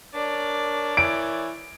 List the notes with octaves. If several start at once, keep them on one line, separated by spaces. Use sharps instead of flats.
D4 A#4 C#5 D5
E3 A#4 C#5 D7